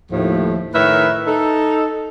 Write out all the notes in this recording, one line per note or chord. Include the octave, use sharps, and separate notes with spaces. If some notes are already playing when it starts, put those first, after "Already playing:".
D#2 A2 F3
A2 D#3 A#4 B4 C#5 E5
D#4 A4